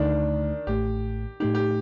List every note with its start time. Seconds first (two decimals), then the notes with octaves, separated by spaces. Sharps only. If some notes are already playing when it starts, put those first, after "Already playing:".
Already playing: D2 D3 D#3 A3 D4 D#4
0.67 A1 A2 A3 G4
1.40 A2 A3 D#4 G4
1.55 G4